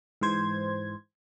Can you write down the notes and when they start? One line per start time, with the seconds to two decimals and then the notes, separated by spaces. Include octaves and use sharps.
0.21 G#2 E3 C5 G#6